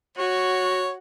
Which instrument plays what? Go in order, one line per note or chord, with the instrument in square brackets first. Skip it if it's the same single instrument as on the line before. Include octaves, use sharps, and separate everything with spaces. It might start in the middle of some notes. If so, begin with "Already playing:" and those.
[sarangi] F#4 [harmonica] C#5